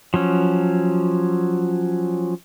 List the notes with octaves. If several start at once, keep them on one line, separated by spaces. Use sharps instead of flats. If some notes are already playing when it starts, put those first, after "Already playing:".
F3 F#3 C#4